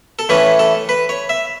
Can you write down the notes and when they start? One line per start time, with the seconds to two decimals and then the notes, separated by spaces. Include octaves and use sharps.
0.19 A4
0.29 A2 E3 A3 C#4 B4
0.59 A4
0.89 B4
1.09 C#5
1.29 E5